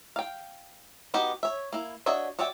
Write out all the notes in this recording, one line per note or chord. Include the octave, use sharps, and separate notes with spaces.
F5 G5
B3 D#4 F#4 G4
C#5 E5
A#3 E4
D4 F#4 C#5 D#5 E5
F#4 C#5 D5 E5 G5